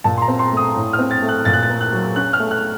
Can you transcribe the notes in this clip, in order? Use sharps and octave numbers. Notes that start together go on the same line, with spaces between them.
A#2 A5
C6
A#5
C4
C6
A3 D#6
A2
F6
C4
A6
A3
F#6
A#2 A6
F#6
A6
A#3
F#6
F#3
C#4 F#6
F6
A3
F#6